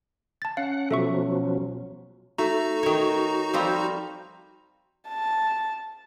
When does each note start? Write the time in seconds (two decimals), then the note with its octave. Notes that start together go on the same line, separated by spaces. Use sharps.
0.42 A5 A6
0.57 C#4 F5 F#5
0.91 B2 F3 F#3 A4 E5 C#6
2.38 A3 D#4 F#4 A#5
2.83 D#3 C#5
3.54 F3 G3 C4
5.09 A5